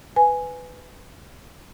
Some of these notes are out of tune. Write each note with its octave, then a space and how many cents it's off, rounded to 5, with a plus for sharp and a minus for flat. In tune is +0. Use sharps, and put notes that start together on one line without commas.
B4 +15 G#5 +0